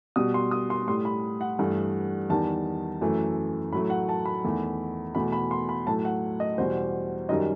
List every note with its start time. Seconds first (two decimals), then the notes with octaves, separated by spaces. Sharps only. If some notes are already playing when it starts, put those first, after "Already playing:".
0.16 B2 G3 D#6
0.34 C6
0.51 D#6
0.70 C6
0.87 A2 G3 C6
1.05 B5
1.41 F#5
1.59 G2 E3 A3
2.29 E2 D#3 G3 A5
3.01 F#2 E3 A3
3.72 A2 F#3 A3 B5
3.90 F#5
4.09 A5
4.26 B5
4.44 E2 D#3 A3
5.15 E2 B2 A3 B5
5.32 B5
5.51 C6
5.69 B5
5.87 A2 F#3 A3 A5
6.05 F#5
6.40 D#5
6.58 E2 B2 G3 C5
7.29 F#2 D#3 G3 D#5